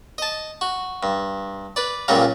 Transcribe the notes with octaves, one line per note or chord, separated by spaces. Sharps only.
D#5 A5
F#4
G2
B4 D5
C#2 A#2 C#3 F#3 G3 A#5